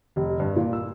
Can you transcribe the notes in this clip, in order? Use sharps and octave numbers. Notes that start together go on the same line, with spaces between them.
F1
G2
A#2
E6